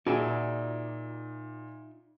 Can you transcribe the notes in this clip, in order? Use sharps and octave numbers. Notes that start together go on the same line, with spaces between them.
A#2 D#4 F4 F#4 G#4 D5 E5